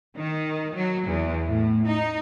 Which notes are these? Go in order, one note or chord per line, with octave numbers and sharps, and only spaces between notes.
D#3
F#3
E2
A2
D#4